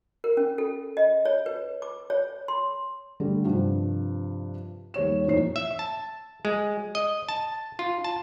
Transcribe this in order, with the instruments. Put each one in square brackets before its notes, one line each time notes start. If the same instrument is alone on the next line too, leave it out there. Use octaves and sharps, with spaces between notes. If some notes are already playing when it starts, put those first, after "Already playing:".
[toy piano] A#4
C#4
A4
D#5
C#5
B4
D6
C#5
C6
[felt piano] D3 G3 A3
G2 C3 F3
D#2 G3 C#5 E7
F2 A#2 E3 D#4 C#5 C7
[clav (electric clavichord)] E5
A5
G#3
D#5
A5
F4
A5